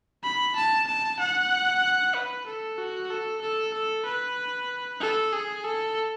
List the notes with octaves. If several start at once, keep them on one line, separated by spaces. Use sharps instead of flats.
B5
A5
A5
F#5
B4
A4
F#4
A4
A4
A4
B4
A4
G#4
A4